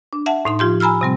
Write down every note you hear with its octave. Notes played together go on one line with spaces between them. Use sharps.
D4
E5 F#5 A5
A2 D#4 C6
F3 F4 G4 C6
G#5 A#5 B5 E6 F6
C3 G3 C4